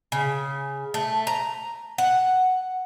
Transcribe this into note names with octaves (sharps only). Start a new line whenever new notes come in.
C#3
A3
A#5
F#5